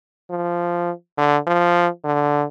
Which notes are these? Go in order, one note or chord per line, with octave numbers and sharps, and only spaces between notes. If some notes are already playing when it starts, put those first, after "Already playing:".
F3
D3
F3
D3